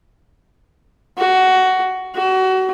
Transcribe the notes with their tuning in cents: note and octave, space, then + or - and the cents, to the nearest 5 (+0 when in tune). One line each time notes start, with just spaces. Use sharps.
F#4 +15
F#4 +30